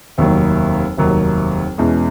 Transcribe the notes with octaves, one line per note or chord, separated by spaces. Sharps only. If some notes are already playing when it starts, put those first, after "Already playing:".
F1 D#2 D#3 F#3
F1 D#2 D#3 F#3
E2 B2 G#3 C#4